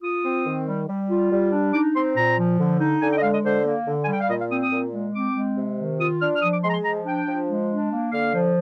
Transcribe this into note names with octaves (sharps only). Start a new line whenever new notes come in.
F4 D#6
C4
D#3
G3
G3
F4
G3
D4
D#4 D6
C4 C6
A#2 A#5
F3
D3
D#4
D3 G#5
G5
D#5
G#3 F5
D#5
D3 C5
A#3
D3
G#5
G3 G5
F5
A#2 D#5
F5
C4 D#6
D#6
A#2
G#3
C4 D6
G#3
C3
D#3
F4 D#6
D4 F6
F6
F3 D#6
D6
G#3 C6
A#5
C6
F3 A#5
D4 G5
F3
G#3
D4
A#3
D3 F5
F3